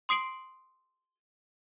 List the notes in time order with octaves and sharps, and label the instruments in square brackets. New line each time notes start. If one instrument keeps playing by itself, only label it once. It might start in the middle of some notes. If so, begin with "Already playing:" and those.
[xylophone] C6 D#6 C7 D7 F#7